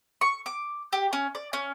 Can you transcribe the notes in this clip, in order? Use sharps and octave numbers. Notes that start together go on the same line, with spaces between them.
C#6
D6
G4
C#4
D5
C#4